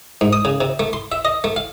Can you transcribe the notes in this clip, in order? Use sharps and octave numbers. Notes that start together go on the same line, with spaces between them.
G#2
D#6
C#3
C3
A3
C6
E5
D#5
A3
F5